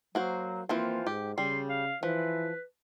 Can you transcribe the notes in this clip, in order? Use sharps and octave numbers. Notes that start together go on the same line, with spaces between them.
F#3 A#3 F#4 C5
E3 F3 A#3 C4 F4
G#2 G4
C#3 G3 C6
F5
E3 F3 B4